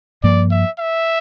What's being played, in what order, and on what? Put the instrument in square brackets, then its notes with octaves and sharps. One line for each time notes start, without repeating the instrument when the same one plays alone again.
[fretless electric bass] G2 F3 A#3 [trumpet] D5
[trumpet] E5
E5